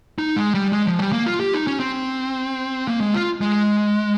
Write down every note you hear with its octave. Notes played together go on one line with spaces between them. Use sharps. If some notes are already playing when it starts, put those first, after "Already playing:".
D#4
G#3
G3
G#3
F3
G3
A#3
F4
G4
D#4
C#4
C4
A#3
G#3
F4
G#3